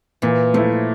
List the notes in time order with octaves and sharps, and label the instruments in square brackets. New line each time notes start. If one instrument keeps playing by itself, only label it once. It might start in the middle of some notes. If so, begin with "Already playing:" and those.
[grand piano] A#2 [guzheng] E3
[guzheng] F3 [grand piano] A3 E4